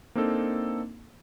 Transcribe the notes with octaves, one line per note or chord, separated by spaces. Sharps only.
A#3 C4 D4 D#4 A4